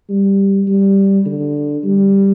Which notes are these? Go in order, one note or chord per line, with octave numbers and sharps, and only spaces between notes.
G3
G3
D3
G3